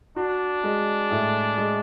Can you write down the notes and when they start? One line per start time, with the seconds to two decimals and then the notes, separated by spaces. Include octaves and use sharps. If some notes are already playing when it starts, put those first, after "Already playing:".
0.16 D4 F#4
0.64 G#3
1.11 A2
1.58 G#3